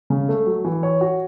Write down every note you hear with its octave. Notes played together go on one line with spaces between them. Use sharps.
C#3
A3
F#3
E3
C#5
F#4